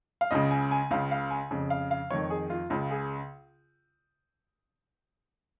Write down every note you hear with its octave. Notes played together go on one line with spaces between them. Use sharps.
F5
C#2 C#3 D#5
G#5
G#5
C#2 C#3 F5
F5
G#5
F2 C#3
F5
F5
F2 D#3 C#5
G#4
F4
C#2 C#3 F4
G#4